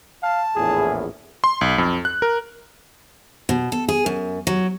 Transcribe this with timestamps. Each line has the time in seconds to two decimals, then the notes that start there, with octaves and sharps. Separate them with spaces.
0.23 F5 A5
0.56 A#1 E2 A2 G#4
1.44 C6
1.61 B1
1.78 F2
2.05 F#6
2.22 A#4
3.49 B2
3.72 A4
3.89 G#4
4.06 F#2
4.47 F#3